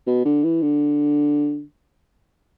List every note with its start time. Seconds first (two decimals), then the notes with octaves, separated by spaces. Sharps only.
0.07 B2
0.25 D3
0.44 E3
0.62 D3